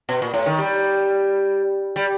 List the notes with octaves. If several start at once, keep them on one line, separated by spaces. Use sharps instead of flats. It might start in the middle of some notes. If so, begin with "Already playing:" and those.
B2
A#2
A2
D#3
G3
G3